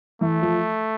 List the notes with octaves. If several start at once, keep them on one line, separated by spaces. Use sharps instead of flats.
E3 A3
F3